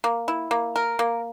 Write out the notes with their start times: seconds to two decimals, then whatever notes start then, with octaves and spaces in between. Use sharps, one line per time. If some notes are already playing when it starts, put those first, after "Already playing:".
0.04 A#3
0.28 E4
0.51 A#3
0.76 A#4
0.99 A#3